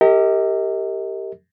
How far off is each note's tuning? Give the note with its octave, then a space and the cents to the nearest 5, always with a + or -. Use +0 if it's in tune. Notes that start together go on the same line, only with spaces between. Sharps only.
G4 +0 A#4 -30 D#5 +40